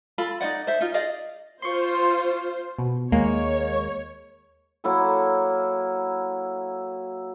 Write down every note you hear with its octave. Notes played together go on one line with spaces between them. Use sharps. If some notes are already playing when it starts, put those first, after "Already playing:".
F4 A4 B5
D#4 F#4 D5 F#5
C5 E5
D#4 F4
G#4 D5 D#5 F5
F4 C5 C6 C#6
B2
D#2 G#3 A#3 C#5
F#3 A#3 E4 A4